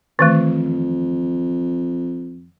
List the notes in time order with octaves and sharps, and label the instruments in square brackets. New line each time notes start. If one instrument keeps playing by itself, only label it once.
[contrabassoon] F2 [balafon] D#3 E3 A3